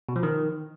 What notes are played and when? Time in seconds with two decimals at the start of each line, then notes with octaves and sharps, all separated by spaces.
0.09 B2
0.16 F3
0.23 D#3